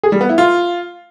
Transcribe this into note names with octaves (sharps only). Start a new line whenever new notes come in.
G#4
G3
B3
E4
F4